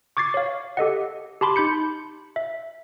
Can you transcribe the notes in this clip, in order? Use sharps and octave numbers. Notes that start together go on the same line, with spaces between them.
C#6 D6 G#6 A6 C7
C#5 F5
G4 A4 D#5 F#5
G4 A5 B5 C6 D6
D#4 B5 G6 C#7
E5